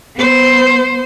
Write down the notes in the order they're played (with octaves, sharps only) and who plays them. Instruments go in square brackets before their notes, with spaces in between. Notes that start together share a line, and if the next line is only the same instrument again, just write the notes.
[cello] B3 C5